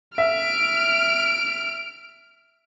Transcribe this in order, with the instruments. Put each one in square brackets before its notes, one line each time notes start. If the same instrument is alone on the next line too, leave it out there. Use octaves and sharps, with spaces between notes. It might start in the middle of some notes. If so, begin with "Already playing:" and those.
[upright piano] E5 [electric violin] F6 D7